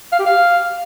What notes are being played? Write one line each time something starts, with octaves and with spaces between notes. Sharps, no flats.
F5
G4
F5